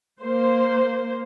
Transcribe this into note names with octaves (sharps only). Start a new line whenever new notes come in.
A#3 C5